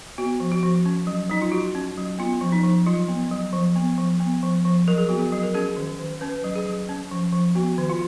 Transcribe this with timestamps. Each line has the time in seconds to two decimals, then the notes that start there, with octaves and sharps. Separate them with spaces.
0.18 B3 F#4
0.40 F3
0.52 F#4
0.63 F3
0.85 C#4
1.07 F#3
1.30 F#3 D#4
1.42 F4
1.52 F#3 F#4
1.75 C#4
1.97 F#3
2.19 B3 F4
2.41 F3
2.52 D#4
2.63 F3
2.86 F#3 F4
3.08 B3
3.31 F#3
3.53 F3
3.76 B3
3.98 F3
4.20 B3
4.43 F3
4.65 F3
4.88 F#3 A#4
4.98 G#4
5.09 B3 F#4
5.19 G#4
5.32 F#3
5.43 A#4
5.54 C#4 G#4
5.77 D#3
6.00 D#3
6.21 C#4 B4
6.44 F#3
6.55 G#4
6.65 F#3
6.89 C#4
7.11 F3
7.33 F3
7.55 B3 F#4
7.78 D#3
7.90 F4